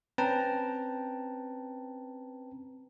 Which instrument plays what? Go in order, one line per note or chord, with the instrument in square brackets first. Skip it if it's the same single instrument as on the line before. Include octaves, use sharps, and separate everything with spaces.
[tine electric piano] C4 C#4 B4 G5 A5 A#5